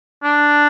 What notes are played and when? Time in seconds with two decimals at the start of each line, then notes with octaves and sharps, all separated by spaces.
0.23 D4